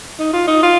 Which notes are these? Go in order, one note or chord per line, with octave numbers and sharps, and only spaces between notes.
D#4
F4
D#4
F4